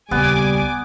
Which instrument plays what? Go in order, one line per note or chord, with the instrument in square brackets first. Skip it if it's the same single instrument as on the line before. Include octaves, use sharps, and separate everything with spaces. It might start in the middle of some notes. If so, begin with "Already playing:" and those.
[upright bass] D#1 C#2 [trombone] G3 [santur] B3 [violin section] G#5 D6